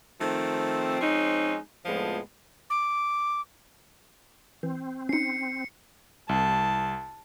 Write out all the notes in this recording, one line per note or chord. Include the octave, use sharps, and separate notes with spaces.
D#3 F3 A3 C4
F3 G#3 C4 C#4 D#4
F2 A2 D3 F3 G#3 B3
D6
E3 C4
C#4 D#4 C7 C#7
C2 A5